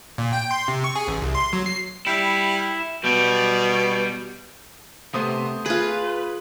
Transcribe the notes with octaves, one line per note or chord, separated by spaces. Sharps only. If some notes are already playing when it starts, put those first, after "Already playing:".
A#2
G5
C6
C3
C#6
G#4
A1
C2
C6
F#3
C7
G3 E4
B2 G3
C3 A3 B3 C5 D#6
F4 G#4 B4